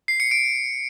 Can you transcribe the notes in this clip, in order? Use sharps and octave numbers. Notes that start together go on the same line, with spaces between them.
C7
C#7
D7